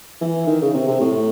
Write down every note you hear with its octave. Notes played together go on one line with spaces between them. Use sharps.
E3
D#3
C#3
C3
C3
A2